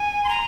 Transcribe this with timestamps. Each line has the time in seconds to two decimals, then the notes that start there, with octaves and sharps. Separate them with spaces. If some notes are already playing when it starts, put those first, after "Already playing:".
Already playing: G#5
0.24 C6
0.29 A#5